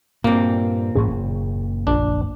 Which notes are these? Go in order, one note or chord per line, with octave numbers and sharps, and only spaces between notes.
G2 A#2 A#3 C4
A1 G#2 C#4 G#4
F#1
A#1 D4